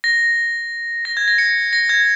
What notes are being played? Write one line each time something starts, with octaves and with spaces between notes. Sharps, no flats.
A#6
A#6
G#6
A#6
C#7
A#6
G#6